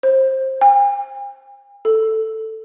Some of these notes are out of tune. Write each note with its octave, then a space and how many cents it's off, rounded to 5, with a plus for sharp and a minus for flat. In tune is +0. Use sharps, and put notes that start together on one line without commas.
C5 +20
G#5 -45
A4 +5